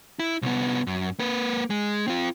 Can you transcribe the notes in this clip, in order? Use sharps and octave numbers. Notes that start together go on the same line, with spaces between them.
E4
C2 B3
F#2
A#3 B4
G#3
C4 F4